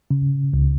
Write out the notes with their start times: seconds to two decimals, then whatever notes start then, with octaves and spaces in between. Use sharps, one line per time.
0.11 C#3
0.53 C#2